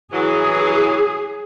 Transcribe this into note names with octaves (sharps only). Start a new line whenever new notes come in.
E3 F#3 G#4